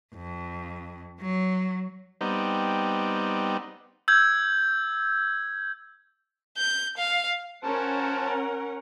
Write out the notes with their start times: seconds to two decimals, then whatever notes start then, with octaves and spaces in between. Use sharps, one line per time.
0.15 F2
1.21 F#3
2.21 G3 B3 C4 D#4
4.08 E6 G6 G#6
6.57 G6
6.97 F5
7.64 C#4 A#4 C5 F#5 A5